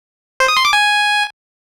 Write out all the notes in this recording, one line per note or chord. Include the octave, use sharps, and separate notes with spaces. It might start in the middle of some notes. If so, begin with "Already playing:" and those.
C5
D#6
C6
D6
G#5